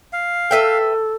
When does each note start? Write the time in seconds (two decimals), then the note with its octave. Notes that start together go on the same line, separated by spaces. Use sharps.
0.13 F5
0.51 A4 B4 E5 G5